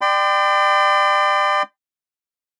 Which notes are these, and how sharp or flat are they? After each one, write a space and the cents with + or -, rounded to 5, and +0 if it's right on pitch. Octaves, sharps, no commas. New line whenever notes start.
D5 +30 G5 +0 C6 -45